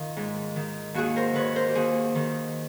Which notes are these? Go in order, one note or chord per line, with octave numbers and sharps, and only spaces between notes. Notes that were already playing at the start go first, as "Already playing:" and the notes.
Already playing: D#3 F4
G#2
D#3
D#2 F#4 G#4
A#4 C5
D#3 B4 C#5
A#4 C5
G4
D#2 F#4 G#4
D#3